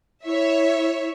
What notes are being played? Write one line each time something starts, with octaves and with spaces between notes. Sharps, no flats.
E4 C#5 E5